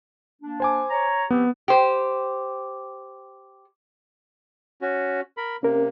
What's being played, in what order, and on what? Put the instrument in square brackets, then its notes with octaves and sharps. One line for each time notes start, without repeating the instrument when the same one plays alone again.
[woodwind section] A#3 D4
[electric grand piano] C5 G#5 D6
[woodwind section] C#5 A#5
[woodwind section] F3 C4 G4 [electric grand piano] B3
[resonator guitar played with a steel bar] G4 C5
[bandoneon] C#4 F#4
A#4 B5
[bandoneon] C3 A#3 [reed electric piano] C#4 A#4